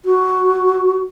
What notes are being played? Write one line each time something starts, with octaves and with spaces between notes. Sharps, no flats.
F#4